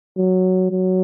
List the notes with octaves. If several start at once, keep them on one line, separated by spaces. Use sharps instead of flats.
F#3
F#3